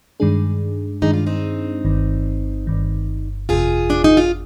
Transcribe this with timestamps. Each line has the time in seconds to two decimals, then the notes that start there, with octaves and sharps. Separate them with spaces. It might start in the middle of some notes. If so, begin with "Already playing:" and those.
0.20 G2 D#3 G#3 D4 G#4
1.02 G2 D#3 G#3 D4 D#4 G#4
1.13 F4
1.26 C4 D#4
1.85 G1 G2 D#3
2.67 G1 G2 D#3
3.49 G1 F2 C3 F4 G#4
3.90 D4
4.04 D#4
4.17 F4